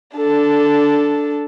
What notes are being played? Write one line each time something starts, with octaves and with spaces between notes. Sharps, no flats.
D4 A4